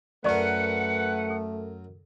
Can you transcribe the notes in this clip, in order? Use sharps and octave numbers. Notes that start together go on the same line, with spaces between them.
F#2 A3 A#4 B4 D5 F#5 C#6
A4